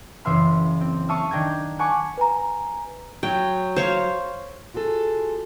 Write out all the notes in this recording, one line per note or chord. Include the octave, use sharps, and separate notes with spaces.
F#1 E3 E5 F5 C6 B6
C4
E5 F5 A5 C#6 D#6
D#3 D4 G5 A#5 G#6
F#5 G#5 A5 B5 C#6 D6
B4 G#5 A#5
F#3 G5
C5 C#5 F5
F4 F#4 G#4 A4